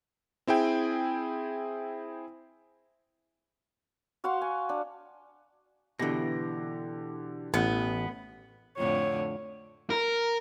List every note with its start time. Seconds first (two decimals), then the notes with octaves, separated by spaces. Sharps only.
0.47 C4 E4 G#4 G5
4.24 F#4 F5 F#5 C6
4.42 G#5
4.69 D4
5.99 B2 D3 E3 G4 A#6
7.54 A1 B3
8.77 F2 A2 D3 C#5
9.90 A#4